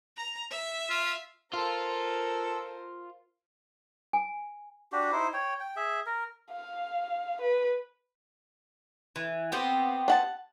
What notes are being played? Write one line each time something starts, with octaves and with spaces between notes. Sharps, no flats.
A#5
E5
F4
F4 A4 A#4 C5
G#5
D4 F#4 G4
D#4 E4 C5
C#5 G5
G5
G#4 E5
A#4
F5
B4
E3
B3 C4 G4
D4 F#5 A5